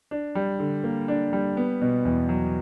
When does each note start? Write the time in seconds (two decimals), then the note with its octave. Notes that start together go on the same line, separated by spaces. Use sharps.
0.11 D4
0.35 G3
0.59 D3
0.84 A#3
1.08 D4
1.33 G3
1.57 B3
1.81 B2
2.05 E2
2.29 F#3